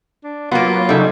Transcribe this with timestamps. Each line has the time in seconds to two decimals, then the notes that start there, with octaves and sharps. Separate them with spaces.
0.24 D4
0.51 F#3 A#3 B3 F4
0.89 C#3 G3 D#4 A4 E5